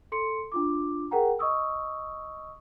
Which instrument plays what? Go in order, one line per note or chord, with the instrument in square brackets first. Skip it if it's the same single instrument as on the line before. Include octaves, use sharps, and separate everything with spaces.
[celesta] A4 C6 C#7
D4 F4 D6
G#4 A#4 F#5 G5 A#5
D#5 C#6 D#6 E6